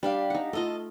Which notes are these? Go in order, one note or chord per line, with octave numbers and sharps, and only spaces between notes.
G3 D4 G4 F5
D#4 F#5
A3 F4 A4 D#5